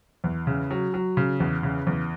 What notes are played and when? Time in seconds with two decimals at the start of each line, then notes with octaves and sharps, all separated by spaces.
0.24 E2
0.47 C#3
0.71 F#3
0.94 F#3
1.17 C#3
1.40 E2
1.63 C#3
1.87 E2